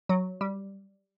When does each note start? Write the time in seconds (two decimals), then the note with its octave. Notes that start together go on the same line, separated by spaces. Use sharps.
0.09 F#3
0.41 G3